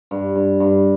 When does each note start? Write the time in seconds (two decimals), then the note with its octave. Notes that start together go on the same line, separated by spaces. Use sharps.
0.11 G2
0.36 G2
0.60 G2